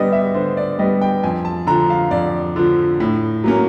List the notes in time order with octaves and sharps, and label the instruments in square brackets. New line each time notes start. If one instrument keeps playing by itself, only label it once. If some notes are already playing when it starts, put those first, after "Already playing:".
Already playing: [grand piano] D3 G3 B3 D5 D#5
E5
D3 C5
D5
G3 B3 D#5
G5
F2 G#5
A5
D3 F3 A#5
F5
F2 D5
D3 F3
A2
F#3 A#3 C#4